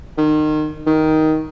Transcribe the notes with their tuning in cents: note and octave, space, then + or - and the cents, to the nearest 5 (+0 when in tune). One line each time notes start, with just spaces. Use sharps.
D#3 -25
D#3 +10